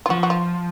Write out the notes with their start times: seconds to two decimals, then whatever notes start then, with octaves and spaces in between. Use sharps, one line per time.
0.06 F4
0.10 F3 F#4
0.23 F#4
0.30 F4